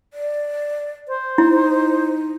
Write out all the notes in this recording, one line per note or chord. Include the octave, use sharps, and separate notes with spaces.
D5
C5
D#4 E4